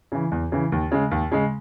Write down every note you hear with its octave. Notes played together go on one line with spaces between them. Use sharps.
C#3 E3
E2
C#3 E3
D#2
C#3 G#3
D#2
C#3 G#3